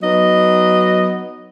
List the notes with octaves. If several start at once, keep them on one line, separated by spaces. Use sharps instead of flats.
F#3 B3 D#4 D#5